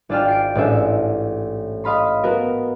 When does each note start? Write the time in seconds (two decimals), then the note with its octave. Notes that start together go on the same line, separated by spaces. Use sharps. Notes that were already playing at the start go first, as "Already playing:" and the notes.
0.09 G#1 D4 F4 D5 G5 F6
0.28 C7 D7
0.55 A1 G#2 D4 E5
1.84 D#5 F5 B5 C6
2.24 B3 F#4 A#4